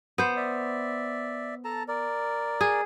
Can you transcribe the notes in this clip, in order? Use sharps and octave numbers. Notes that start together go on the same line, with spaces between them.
B3 C5
D5 E5
A4 A5 A#5
A#4 D5
G#4